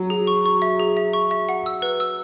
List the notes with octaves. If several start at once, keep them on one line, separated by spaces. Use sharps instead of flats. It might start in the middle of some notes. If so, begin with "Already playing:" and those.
Already playing: F#3
G#4
C#6
C#6
E5
G#4
E5
C#6
E5
F#5
E6
B4
E6